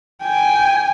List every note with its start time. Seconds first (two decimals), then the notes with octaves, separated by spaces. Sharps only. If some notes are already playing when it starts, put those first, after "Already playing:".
0.23 G5 G#5